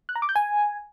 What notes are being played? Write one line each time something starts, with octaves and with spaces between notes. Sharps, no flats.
F#6
A#5
D6
G6
G#5